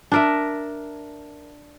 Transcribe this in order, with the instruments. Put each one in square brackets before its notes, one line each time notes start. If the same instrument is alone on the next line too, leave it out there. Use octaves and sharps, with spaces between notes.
[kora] D4 A#4 E5